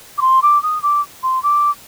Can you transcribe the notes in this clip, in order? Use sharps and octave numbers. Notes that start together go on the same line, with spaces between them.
D6
C6
D6
D#6
D6
C6
D6